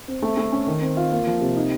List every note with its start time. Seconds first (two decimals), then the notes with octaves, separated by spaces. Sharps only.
0.08 C4
0.22 A3
0.37 A3
0.52 C#4
0.67 D#3
0.82 C4
0.97 F4
1.12 A#3
1.27 F3
1.41 C3
1.56 D#4